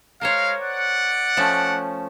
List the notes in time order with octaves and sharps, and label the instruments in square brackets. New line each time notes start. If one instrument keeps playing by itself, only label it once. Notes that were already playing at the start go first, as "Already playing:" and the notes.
[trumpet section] G#3 F5 [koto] A#4 C5 C#5
[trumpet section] D5 F#5
[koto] F3 A3 C#4